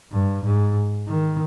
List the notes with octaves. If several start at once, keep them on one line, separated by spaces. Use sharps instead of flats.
G2
G#2
D#3